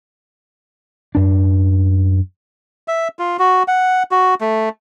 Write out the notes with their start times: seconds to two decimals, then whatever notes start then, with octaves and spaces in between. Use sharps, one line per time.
1.15 F#2 D4
2.88 E5
3.19 F4
3.39 F#4
3.68 F#5
4.11 F#4
4.41 A3